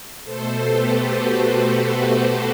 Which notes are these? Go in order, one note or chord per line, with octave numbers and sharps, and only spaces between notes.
B2 A3 A4 C5
G4 B4
F#4 A4
A4 C5